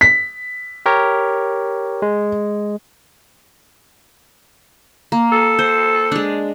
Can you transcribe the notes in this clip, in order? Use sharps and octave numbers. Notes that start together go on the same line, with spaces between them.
B6
G4 A#4 C#5
G#3
A#3
A4
C5
G#3 D4